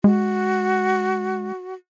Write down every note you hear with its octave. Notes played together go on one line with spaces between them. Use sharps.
G#3 F#4